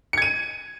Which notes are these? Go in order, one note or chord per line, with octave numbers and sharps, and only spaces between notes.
G#6 C#7 D#7